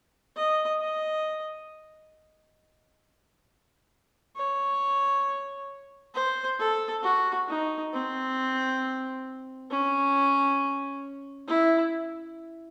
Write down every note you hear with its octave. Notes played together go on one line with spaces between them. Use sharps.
D#5
D#5
C#5
C5
A4
F#4
D#4
C4
C#4
E4